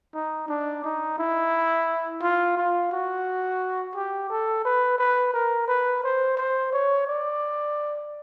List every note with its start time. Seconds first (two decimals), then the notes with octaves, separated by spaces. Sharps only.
0.15 D#4
0.49 D4
0.84 D#4
1.18 E4
2.22 F4
2.57 F4
2.92 F#4
3.95 G4
4.30 A4
4.65 B4
4.99 B4
5.34 A#4
5.68 B4
6.04 C5
6.37 C5
6.73 C#5
7.07 D5